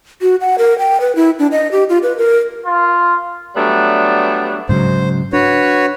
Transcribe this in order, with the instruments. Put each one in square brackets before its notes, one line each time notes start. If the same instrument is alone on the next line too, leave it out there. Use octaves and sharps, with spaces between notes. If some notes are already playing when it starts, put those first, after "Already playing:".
[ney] F#4
F#5
A#4
G5
B4
E4
D4
D#5
G4
F4
B4
A#4
[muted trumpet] F4
[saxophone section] F#3 G3 A3 B3 D4
[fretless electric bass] G#2 C#3 F#3 [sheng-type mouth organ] C5
[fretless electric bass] D4 [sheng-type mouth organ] F#4 B4 C#5